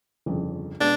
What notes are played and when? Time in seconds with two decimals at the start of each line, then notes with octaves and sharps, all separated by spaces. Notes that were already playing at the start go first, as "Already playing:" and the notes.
0.26 G1 F2 C#3
0.81 B2 G#3 D4